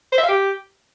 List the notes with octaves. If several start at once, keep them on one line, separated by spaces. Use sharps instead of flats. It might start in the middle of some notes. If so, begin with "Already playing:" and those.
C5
E5
F5
G4